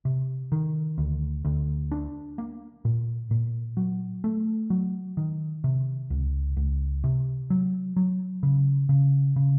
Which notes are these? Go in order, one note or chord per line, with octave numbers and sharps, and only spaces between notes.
C3
D#3
D2
D2
D4
A#3
A#2
A#2
F#3
A3
F#3
D#3
C3
C#2
C#2
C3
F#3
F#3
C#3
C#3
C#3